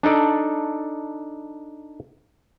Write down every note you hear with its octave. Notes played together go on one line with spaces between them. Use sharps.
D4 D#4 A4 D5